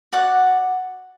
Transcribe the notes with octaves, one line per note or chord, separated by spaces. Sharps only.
F#4 D5 F#5